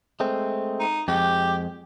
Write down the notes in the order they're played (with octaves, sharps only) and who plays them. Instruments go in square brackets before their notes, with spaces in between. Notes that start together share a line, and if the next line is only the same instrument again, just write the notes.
[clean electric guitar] G#3 A3 C4
[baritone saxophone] D#4
[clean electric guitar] F2 G#3 [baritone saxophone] G4